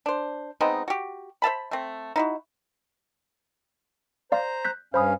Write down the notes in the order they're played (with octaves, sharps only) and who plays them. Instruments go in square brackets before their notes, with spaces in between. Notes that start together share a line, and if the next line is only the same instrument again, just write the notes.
[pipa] D4 C5
G#3 B3 C4 D#4
F#4 G4
C5 E5 A5 B5
A3 C4
D#4 E4 F#4
[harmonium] C5 A#5 [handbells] D5 F5 C6
[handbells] F#6 G6 B6
[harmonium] G2 C#4 F5 [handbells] C5 B5 D#6